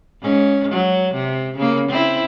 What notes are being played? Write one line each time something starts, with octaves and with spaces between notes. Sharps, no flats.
G#2 C#4
F#3
C3
C#3 A#3
C4 E4